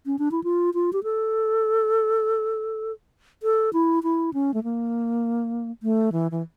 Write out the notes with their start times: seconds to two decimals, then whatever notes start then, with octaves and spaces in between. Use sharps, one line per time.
0.06 C#4
0.19 D4
0.31 E4
0.44 F4
0.74 F4
0.93 G4
1.03 A4
3.43 A4
3.73 E4
4.03 E4
4.34 C#4
4.54 A3
4.64 A#3
5.83 A3
6.12 E3
6.31 E3